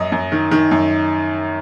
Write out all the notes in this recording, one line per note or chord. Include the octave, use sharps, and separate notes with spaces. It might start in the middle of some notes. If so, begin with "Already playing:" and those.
Already playing: F#2 D#5
F#2
D#3
D#3
F#2